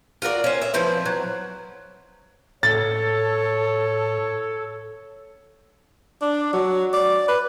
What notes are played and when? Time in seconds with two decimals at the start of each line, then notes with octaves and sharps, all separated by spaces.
0.22 F4 F#4 A#4 D5
0.44 C#4 C5
0.62 E5
0.74 F3 C4 E4 B4
1.06 F#3
2.63 A2 A4 C#5 A6
6.22 D4
6.53 F#3
6.94 D5
7.28 B4